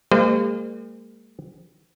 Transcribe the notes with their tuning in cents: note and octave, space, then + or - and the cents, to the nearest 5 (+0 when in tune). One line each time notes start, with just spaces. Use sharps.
G3 +45 A#3 -40 C5 -45